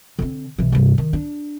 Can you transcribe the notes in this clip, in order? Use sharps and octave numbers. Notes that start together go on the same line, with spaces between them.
D3 C4
B1 E3
G2 C3
D#3
D4